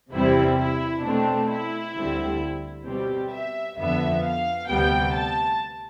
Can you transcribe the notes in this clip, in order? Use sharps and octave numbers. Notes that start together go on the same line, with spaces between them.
E2 C3 G3 C4 E4
E4
B2 A3 C4 D4
E4
D2 D3 G3 C4
B2 G3 C4 G4
E5
F2 D3 F3 B3 E5
F5
D2 C3 G3 B3 G5
A5